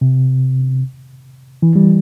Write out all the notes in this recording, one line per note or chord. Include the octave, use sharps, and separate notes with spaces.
C3
E3
G3